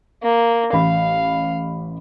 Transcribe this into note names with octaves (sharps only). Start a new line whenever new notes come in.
A#3
A1 F5 B5